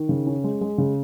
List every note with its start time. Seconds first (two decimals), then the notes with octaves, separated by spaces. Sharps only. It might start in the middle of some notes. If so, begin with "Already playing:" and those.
Already playing: D#3
0.09 C#3
0.27 C#4
0.44 G#3
0.61 G#3
0.78 C#3